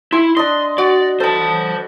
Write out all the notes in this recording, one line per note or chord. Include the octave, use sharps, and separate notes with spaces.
E4 C6
D4 D#5 C6
F#4 D5
A4 C5 A5 B5